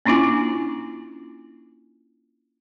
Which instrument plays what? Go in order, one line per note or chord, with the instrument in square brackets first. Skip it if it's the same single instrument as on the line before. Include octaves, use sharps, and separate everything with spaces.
[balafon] A#3 C#4 D4 E4 F4 G#5